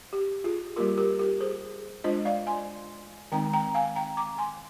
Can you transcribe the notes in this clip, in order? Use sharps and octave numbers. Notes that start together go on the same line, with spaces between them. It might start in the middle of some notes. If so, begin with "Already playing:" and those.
G4
F4 G#4
G3 A#3 F4 G4 A#4
G4 A#4
G4 A#4
G#4 C5
G#3 D4 F4 C5 D#5
D5 F5
G#5 C6
D#3 G#3 C4 D#4 G5 A#5
G5 A#5
F5 G#5
G5 A#5
A#5 D6
G#5 C6